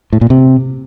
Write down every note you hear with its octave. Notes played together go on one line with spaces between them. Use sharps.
A2
A#2
C3